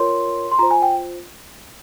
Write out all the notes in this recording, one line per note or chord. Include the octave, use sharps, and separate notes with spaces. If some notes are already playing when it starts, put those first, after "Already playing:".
Already playing: F4 A#4 C#5 C6
C6
F4 C5 A#5
G#5
G5